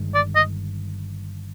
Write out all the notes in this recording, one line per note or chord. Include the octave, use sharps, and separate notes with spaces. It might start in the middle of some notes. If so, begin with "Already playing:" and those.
Already playing: G1 G2 D#3 G#3
D5
D#5